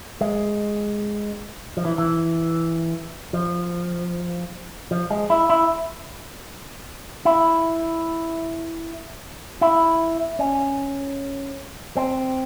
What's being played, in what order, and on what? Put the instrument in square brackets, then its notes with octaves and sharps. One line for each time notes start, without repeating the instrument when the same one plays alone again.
[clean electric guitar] G#3
F3
E3
E3
F3
F3
G#3
E4
E4
E4
E4
C#4
C4